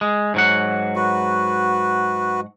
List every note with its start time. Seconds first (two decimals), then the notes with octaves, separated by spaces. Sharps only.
0.01 G#3
0.34 G#2 F#3 F#5
0.95 F#4 B4